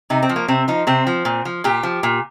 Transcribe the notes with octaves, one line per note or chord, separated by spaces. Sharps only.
C3 D#4
C4
F3
A#3
C3 C4
F3 D#4
C3 C4
F3
A#2
F3
A#2 G4
F3
A#2